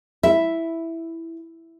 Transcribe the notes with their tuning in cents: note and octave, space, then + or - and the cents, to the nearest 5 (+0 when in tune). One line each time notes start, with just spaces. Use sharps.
E4 +0 E5 +0